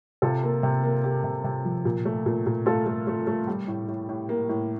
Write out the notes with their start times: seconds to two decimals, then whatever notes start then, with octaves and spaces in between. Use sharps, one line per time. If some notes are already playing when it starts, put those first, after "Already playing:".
0.22 C3 F4 A4
0.43 A#3
0.63 C3
0.84 A#3
1.04 A#3 G4
1.24 C3
1.44 C3
1.65 F3
1.85 A#2
2.05 A3
2.26 A#2
2.46 A#2
2.66 A3 F4 A4
2.86 A3
3.07 A3
3.27 A3
3.47 G3 G4
3.68 A2
3.88 A2
4.09 A2
4.29 A#3
4.49 A2